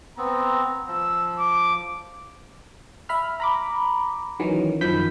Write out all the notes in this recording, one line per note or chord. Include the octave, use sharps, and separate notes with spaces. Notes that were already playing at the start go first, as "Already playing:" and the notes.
B3 C4 A#5
F3 E6
D6
E5 B5 F6
A#5 B5 D6
D#3 E3 F#3 C#4
F#2 D#3 F3 B5 G6 B6